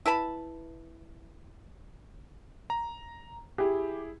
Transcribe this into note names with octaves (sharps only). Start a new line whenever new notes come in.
E4 B4 A5 B5
A#5
E4 G4 G#4